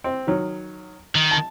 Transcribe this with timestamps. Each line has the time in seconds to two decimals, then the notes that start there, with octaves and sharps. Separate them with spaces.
0.04 C4
0.27 D#3 F#3
1.15 D#3
1.31 A5